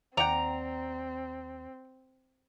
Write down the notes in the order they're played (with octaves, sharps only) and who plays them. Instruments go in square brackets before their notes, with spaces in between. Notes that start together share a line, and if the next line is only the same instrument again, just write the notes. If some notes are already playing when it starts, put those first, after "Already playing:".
[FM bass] D#2 [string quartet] C4 [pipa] D5 F#5 G5 [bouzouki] A#5